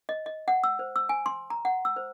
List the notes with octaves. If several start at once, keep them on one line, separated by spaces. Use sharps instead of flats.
D#5
D#5
F#5
E6
C5
E6
G#5
C6
A#5
F#5
E6
C5